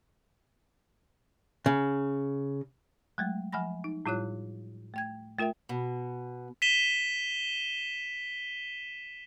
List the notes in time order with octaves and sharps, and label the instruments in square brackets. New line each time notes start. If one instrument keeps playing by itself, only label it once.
[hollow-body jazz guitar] C#3
[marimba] F#3 G#3 A3
F3 F#5 G#5 B5 A#6
D#4
A2 G3 E4 F4 C#5 F#6
A3 G5 G#6
A3 F4 A#4 E5 G5
[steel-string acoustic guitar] B2
[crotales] B6 D#7 E7 G7